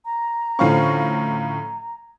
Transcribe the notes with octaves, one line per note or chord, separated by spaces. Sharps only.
A#5
A2 D3 F3 C#4 F5 C#6